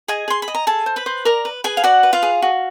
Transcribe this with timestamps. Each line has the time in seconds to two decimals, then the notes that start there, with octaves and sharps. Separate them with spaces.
0.08 G#4 D#5 G#5
0.28 G#4 C6
0.42 B5
0.48 D#5
0.55 A#5
0.67 G#4 A4 A5
0.86 C5
0.96 B4 B5
1.06 C5
1.25 A#4 D5 A#5
1.45 B4
1.64 G#4 B4 G#5
1.77 F5
1.84 F#4 D5 F#5
2.03 B4
2.13 F4 F5
2.23 G#4
2.42 F#4